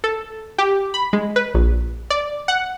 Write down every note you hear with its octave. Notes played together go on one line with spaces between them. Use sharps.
A4
G4
B5
G#3
B4
A#1
D5
F#5